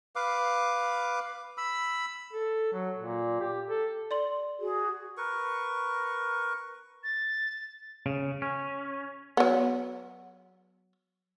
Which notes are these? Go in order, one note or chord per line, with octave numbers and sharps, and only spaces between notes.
B4 F5 D6
B5 E6
A4
F#3
A#2
G4
A4
D5 C6 F#7
F#4 G#4
A#4 B4 C#6
A6
C#3
C#4
F#3 B3